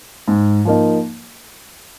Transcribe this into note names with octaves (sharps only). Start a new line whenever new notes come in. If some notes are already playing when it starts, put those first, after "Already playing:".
G#2
F3 A#3 D#4